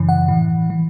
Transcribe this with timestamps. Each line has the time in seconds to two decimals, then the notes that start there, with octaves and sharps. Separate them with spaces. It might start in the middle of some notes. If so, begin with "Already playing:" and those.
Already playing: F#2 C#3 E3
0.09 F#5
0.28 A2 E3
0.70 E3